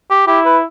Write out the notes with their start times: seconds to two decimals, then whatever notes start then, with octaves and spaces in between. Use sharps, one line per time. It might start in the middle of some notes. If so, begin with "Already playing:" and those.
0.10 G4
0.27 E4 G4
0.45 B4